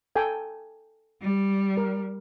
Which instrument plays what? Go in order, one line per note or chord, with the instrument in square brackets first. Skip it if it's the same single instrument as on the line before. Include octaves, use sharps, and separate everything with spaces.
[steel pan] A4 G5 G#5
[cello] G3
[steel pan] A#4